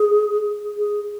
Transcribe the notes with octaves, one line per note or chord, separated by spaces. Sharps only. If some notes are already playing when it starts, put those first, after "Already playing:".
Already playing: G#4
G#4